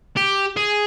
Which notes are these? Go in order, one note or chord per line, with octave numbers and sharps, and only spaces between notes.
G4
G#4